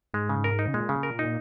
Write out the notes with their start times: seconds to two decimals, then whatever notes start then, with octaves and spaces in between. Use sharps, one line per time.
0.14 G#2 G#3
0.29 C#3
0.44 A#4
0.59 D#4
0.68 C#3
0.74 A#2 G#3
0.89 C#3
1.03 A#4
1.19 D#4